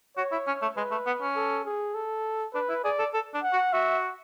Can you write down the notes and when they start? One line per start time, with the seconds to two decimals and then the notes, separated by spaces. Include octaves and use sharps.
0.17 F#4 C#5
0.32 E4
0.47 C#4
0.62 A3
0.76 G#3 B4
0.91 A3
1.06 B3
1.21 C#4
1.36 A4
1.65 G#4
1.95 A4
2.54 D4 B4
2.69 E4
2.84 G#4 D5
2.99 A4
3.14 A4
3.34 D4
3.43 F#5
3.53 F#4
3.73 F#4 E5